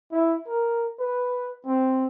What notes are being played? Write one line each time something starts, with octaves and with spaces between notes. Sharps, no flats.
E4
A#4
B4
C4